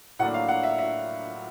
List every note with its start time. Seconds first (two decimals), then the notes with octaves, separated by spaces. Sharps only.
0.19 A2 F#3 A#3 D4 F#5
0.34 F5
0.48 F#5
0.63 E5
0.78 E5